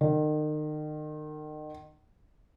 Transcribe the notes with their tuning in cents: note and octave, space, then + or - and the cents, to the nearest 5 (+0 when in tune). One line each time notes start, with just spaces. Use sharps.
D#3 -35